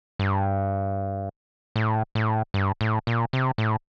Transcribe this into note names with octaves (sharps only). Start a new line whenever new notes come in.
G2
A2
A2
G2
A2
A#2
C3
A2